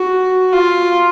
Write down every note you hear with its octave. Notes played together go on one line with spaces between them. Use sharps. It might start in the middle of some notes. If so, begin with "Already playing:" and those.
Already playing: F#4
F4